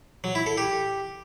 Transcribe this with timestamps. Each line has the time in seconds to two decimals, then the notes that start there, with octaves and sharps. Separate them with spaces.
0.24 F#3
0.35 E4
0.46 A4
0.57 G4